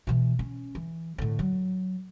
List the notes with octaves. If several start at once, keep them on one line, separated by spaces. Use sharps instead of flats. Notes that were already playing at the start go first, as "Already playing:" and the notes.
B2 E3
C#4
E3
A2 D3
F#3